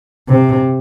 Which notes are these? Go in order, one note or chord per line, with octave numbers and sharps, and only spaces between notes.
C3